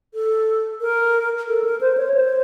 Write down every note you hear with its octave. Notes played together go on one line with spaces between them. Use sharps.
A4
A#4
A4
A#4
C5
C#5
C5